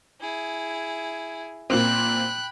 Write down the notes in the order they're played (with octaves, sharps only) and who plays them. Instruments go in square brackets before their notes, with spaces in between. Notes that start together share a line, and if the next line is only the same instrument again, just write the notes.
[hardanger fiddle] E4 G#4
[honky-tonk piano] A#2 A#3 C4 [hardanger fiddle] G5 B5 [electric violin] F#6